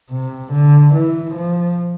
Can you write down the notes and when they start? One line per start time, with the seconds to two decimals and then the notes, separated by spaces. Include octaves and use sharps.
0.11 C3
0.52 D3
0.94 E3
1.35 F3